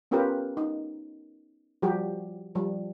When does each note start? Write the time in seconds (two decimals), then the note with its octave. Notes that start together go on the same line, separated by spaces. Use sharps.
0.11 B3 C#4 F4 G4 A#4 B4
0.57 D#4
1.82 F3 G3 F#4 G4
2.55 F3 G3